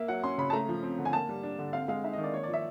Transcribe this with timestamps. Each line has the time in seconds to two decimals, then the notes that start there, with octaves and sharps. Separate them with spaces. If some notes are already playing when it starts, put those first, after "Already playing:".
Already playing: A#3 E5
0.08 F#3 F#5
0.24 C#4 C6
0.38 C#3 B5
0.50 A5
0.53 A3 A#5
0.69 F3
0.83 C4
0.99 D3
1.05 G#5
1.13 A#3 A5
1.29 G3
1.43 D4
1.59 D3
1.73 C4 F5
1.88 G#3 F5
2.04 D#4 E5
2.13 D#3 D#5
2.24 D5
2.34 A#3 C#5
2.43 F3 D5
2.53 E5